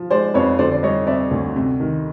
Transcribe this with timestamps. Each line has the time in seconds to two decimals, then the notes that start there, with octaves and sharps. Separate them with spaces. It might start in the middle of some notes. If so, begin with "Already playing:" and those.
Already playing: F3
0.11 G#3 C5 D5
0.34 F2 B4 C#5
0.59 D3 C5 D5
0.72 D5
0.83 G3 C#5 D#5
1.06 C4 D5 E5
1.31 D2
1.56 C3
1.80 D#3